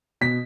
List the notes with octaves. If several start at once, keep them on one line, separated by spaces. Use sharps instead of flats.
B2 B6